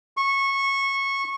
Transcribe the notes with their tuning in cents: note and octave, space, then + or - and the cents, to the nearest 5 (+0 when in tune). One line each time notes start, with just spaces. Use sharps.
C#6 -15